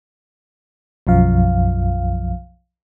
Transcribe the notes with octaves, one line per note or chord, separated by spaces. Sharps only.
B1 F#2 F3 F5